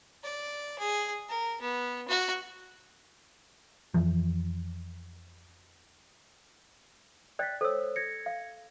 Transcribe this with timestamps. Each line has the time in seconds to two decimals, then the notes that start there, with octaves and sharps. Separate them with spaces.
0.24 D5
0.79 G#4
1.29 A#4
1.61 B3
2.08 F#4
3.94 F2 E3 F3
7.39 D5 G5 F#6 A6 B6
7.61 A4 C5 C#5 E6
7.96 G#6 A#6 C#7
8.26 F5